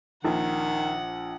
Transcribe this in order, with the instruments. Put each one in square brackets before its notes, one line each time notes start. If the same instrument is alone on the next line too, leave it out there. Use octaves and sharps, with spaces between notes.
[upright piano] A#1 [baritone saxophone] D#3 [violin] F#5